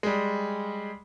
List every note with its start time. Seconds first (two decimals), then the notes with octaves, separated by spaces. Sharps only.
0.03 G3 G#3